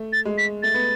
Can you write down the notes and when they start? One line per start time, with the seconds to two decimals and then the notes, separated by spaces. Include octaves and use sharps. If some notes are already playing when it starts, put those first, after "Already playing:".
Already playing: A3
0.13 A6
0.25 G#3
0.38 B6
0.63 A3 A6
0.74 B3